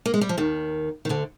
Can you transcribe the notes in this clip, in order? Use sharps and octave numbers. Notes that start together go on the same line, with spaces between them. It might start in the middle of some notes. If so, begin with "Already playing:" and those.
A#3
G#3
G3
F3
D#2 D#3
D#3
D2 D3